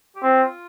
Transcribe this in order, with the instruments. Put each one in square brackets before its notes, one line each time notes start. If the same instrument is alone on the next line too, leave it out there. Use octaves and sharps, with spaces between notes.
[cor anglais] G4
[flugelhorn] C4 [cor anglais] F4